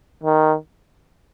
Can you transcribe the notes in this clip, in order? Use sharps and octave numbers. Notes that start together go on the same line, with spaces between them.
D#3